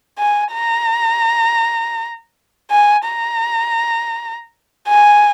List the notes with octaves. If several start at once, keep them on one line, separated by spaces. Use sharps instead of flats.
G#5
A#5
G#5
A#5
G#5